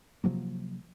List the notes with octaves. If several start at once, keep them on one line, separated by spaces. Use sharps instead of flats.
C3 F3 F#3 A#3